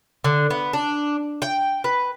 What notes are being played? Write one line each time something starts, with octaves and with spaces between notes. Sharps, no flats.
D3
B3
D4
G5
B4